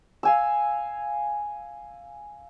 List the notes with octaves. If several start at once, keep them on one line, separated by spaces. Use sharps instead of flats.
F5 G#5 E6